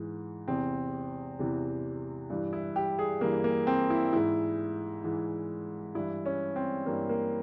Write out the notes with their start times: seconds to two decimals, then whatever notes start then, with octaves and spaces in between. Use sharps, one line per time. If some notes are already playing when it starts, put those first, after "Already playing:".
Already playing: G#2 E3
0.48 E2 C3 E3 C4
1.39 E2 C3 E3
2.30 G2 E3
2.53 E4
2.76 G4
2.99 G#4
3.21 G2 E3 A#3
3.44 A#3
3.67 C4
3.90 E4
4.13 G#2 E3 E4
5.04 G#2 E3
5.95 G2 E3 E4
6.26 C#4
6.56 C4
6.86 G2 E3 A#3
7.09 A#3